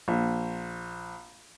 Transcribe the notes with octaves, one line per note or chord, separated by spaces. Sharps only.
A#1